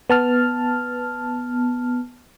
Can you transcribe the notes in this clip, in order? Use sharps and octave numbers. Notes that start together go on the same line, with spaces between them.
B3 A5 F6